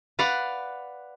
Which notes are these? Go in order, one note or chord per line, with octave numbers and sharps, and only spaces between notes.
B4 D5 F5 F#5